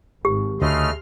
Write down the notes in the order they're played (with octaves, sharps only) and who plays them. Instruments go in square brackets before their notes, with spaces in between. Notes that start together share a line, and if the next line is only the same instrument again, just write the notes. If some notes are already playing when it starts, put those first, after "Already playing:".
[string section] G#1 [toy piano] G4
[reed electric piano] D2 [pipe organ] C#3 A3 D#5 [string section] C6 F6